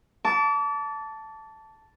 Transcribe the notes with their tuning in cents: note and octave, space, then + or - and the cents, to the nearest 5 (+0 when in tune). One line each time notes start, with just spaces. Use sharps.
A5 +0 D6 -35